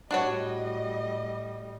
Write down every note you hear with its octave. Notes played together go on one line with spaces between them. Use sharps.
A2 G3 D4 F#4 C#5 D#5